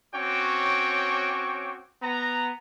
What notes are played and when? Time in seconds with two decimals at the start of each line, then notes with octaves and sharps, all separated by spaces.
0.14 C4 C#4 F#4 C#5 G5 D6
2.02 B3 A#5